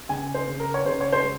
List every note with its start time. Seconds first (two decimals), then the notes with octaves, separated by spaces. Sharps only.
0.09 C#3 G#5
0.34 C5
0.47 C#3
0.60 A#4
0.74 C#5
0.85 C#3 C5
1.01 C#5
1.13 C5
1.23 G#3